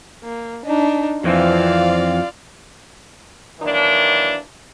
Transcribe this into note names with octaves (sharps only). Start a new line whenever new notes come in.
A#3
D4 D#4
F2 E3 C4 F4 D5 F5
D#3 E3 F#3 A#3 D4